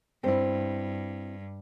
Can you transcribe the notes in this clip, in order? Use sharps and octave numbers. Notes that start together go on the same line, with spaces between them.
G2 C4 E4